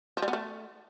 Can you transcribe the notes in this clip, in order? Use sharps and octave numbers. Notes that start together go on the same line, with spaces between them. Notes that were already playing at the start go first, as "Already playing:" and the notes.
F3
G3
B3
A3